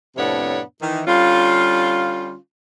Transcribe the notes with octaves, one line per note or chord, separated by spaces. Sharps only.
F2 A2 C3 B3 D4 C#5
D#3 E3
D3 G3 C#4 F4